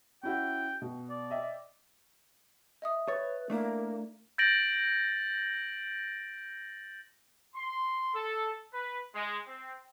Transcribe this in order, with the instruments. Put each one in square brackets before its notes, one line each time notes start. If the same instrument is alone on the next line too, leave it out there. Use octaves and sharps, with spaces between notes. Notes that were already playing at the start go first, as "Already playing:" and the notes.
[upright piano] C#4 E4 F#4 [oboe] G5
[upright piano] B2
[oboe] D5
[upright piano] D#5 E5 G5
[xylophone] D#5 E5 D#6
[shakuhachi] B4 [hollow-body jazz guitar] C#5 [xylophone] A6
[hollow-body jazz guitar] A3 D4 E4 [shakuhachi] A#3
[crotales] G6 A6 A#6 D7 F#7
[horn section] C6
A4
B4
G#3
C4